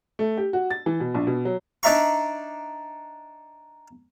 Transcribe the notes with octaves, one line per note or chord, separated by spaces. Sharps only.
A3
G4
F#4
A6
E3
B2
A#1
B2
F#3
D4 D#4 D5 E5 A#5 C#6